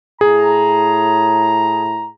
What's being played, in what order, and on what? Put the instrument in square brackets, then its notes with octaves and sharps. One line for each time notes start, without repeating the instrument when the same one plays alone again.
[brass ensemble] A2 A#5 [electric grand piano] G#4